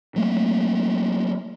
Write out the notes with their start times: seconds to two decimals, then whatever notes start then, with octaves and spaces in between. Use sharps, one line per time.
0.16 F#3 A3 A#3